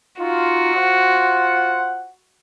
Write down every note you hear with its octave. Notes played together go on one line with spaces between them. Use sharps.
D#4 F4 F#4
F4 C5 F#5